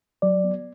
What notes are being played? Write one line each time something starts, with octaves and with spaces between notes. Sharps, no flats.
F#3 D5
B3